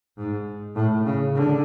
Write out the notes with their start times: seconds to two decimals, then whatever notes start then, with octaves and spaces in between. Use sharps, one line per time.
0.18 G#2
0.76 A2
1.05 C#3
1.35 D3